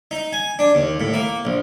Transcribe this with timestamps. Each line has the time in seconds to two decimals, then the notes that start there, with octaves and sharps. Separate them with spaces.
0.11 D#4
0.33 G#5
0.59 D4
0.75 D#2
1.00 A2
1.14 A#3
1.45 A#1